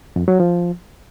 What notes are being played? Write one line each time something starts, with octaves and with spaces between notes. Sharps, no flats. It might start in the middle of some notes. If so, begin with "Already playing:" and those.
F2
F#3
F3